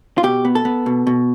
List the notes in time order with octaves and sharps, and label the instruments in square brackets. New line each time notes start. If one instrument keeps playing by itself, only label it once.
[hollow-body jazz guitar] F4
B2 G4
B3
A4
B3
B2
B2